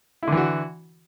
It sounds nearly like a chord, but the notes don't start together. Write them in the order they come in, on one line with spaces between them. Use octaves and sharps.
E4 D3 E3 F#4